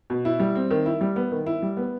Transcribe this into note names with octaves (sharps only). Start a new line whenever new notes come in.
B2
E4
G3
C4
D#3
E4
G3
B3
D#3
E4
G3
B3